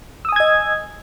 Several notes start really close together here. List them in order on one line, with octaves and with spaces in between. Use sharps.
E6 D#6 G#5 G#6 D#5